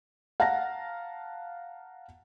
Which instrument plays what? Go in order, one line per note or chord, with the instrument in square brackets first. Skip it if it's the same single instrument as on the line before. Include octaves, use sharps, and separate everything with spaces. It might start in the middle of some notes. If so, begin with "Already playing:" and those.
[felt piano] F5 F#5 A5 A#5 A#6